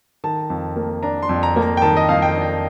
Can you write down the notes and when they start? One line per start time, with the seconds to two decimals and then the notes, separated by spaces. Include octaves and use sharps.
0.24 D#3 A5
0.50 F2
0.76 A#3
1.03 D4 A#5
1.23 C6
1.29 F2
1.43 A#5
1.56 A#3
1.62 A#5
1.77 G5
1.82 D#3 A5
1.97 D#5
2.09 F2 F5
2.22 G5
2.36 D4
2.42 G5